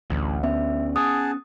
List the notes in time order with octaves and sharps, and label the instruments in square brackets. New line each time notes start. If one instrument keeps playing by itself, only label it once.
[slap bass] A1 [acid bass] D2
[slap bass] B3 C#4 [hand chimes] E5
[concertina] G#4 F#5 A5 [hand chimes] D#6